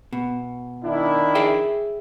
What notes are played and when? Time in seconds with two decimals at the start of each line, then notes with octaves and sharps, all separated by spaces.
0.13 B2
0.84 D#3 D4 E4
1.35 G#4 E5 G5